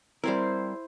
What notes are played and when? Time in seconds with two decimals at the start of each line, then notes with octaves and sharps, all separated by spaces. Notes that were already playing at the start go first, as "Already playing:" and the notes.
0.24 G3 C4 E4 A#4 C5